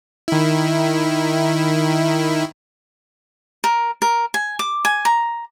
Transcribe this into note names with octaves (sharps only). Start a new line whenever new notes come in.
D#3 E4
A#4
A#4
G#5
D6
G#5
A#5